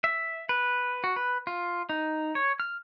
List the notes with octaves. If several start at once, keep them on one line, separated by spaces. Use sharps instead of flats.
E5
B4
F#4
B4
F4
D#4
C#5
F6